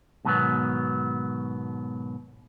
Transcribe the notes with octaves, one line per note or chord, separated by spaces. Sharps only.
G#2 B2 D#3 E3 F#3 B3